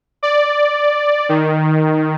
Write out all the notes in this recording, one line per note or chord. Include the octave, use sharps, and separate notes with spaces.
D5
D#3